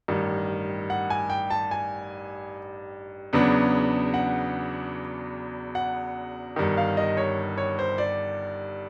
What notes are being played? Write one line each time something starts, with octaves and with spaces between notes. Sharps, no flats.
A1 G2 D#3
F#5
G#5
G5
A5
G#5
E2 C#3 F#3 B3 D4
F#5
F#5
G1 G2 D#3
F5
D#5
C#5
C#5
C5
D5